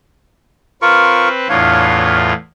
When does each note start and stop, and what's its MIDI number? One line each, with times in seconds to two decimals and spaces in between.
0.82 1.48 60
0.82 1.28 65
0.82 1.28 70
0.82 1.48 71
0.82 1.28 85
1.49 2.33 40
1.49 2.33 45
1.49 2.18 62
1.49 2.33 65
1.49 2.18 73
1.49 2.18 77